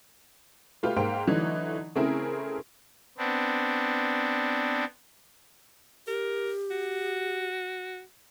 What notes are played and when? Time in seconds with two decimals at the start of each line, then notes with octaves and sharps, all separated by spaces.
0.83 A3 F4 G4 B4
0.96 G#2 A#3 C5 F5 G5
1.27 D3 E3 F#3 A3 D#4
1.95 C#3 A3 C4 E4 G#4 A#4
3.18 B3 C4 D4
6.07 G4 A#4
6.70 F#4